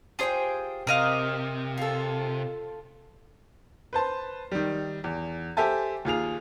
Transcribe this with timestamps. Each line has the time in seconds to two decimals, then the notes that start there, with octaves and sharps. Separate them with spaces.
0.19 F4 G4 G#4 C5 G5
0.87 C3 A#4 D#5 F5
1.78 F4 A4
3.93 B4 C5 A5 C6
4.52 D#3 G3
5.04 E2
5.57 G4 A4 C5 E5 G#5 A5
6.05 D#2 F4 G#4 F7